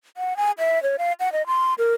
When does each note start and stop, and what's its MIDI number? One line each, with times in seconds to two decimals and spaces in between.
0.17 0.37 78
0.37 0.51 80
0.59 0.82 76
0.83 0.96 73
0.98 1.13 77
1.20 1.32 78
1.32 1.46 75
1.47 1.74 84
1.78 1.93 70